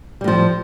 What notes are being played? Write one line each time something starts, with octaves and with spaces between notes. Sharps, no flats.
A2 F3 G3